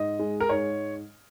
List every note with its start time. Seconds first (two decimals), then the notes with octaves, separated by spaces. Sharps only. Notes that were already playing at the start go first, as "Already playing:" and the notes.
Already playing: G#2 D#5
0.19 G#3
0.40 A#4
0.49 G#2 C#5